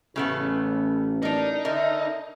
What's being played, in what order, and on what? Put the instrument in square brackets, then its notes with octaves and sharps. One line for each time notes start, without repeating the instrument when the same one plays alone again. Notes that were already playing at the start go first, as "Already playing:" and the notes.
[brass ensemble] A1 [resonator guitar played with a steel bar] C#3 A3 B3
[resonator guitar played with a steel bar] D4 A#4 [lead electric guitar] D#4
[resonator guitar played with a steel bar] D3 A#4 [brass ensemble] E5